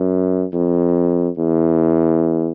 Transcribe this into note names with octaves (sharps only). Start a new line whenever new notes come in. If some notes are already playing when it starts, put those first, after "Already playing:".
Already playing: F#2
F2
E2